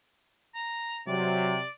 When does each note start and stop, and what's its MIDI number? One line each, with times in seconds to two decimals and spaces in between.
0.55 1.00 82
1.08 1.62 48
1.08 1.57 54
1.08 1.68 74